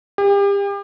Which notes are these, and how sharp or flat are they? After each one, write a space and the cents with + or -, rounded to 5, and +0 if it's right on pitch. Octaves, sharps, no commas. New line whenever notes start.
G4 +35